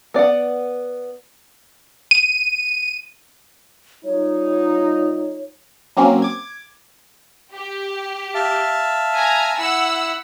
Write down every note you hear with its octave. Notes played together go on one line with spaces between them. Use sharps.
B3 D5 F5 F#5
D#7
G3 D#4 F4 C#5
F#3 A#3 C4 C#4
D6 G#6
G4
E5 F5 A5
G#5 A#5
E4 E5 F#5 E6